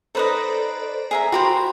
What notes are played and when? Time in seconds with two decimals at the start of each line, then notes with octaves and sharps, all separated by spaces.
0.15 D#4 A4 B4 C5 D5 D#5
1.11 G#4 E5 A#5
1.32 F#4 G4 A#4 C5 B5